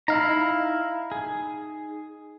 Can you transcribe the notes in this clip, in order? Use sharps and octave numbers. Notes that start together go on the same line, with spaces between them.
D#4 E4 F5 A#5
G#4